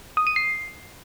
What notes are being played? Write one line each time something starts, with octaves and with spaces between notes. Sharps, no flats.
D#6
D#7
C7